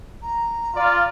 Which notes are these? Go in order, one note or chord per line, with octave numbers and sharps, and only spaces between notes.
A#5
F4 D5